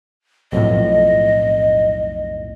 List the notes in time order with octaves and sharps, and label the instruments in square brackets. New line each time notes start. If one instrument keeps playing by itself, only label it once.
[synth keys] B1 F2 A2 [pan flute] D#5